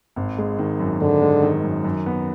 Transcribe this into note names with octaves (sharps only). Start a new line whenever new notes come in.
G#1
G#3
D#3
F#2
G#1 D3
G#3
D#3
F#2
F#2
B3